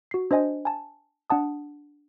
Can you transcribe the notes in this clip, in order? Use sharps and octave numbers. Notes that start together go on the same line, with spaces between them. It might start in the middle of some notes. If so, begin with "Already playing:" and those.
F#4 C7
D4 C5 D#5 G#5
G#5 A5
D4 F#5 A5 D#6